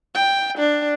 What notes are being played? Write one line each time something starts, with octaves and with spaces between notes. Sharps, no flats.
G5
D4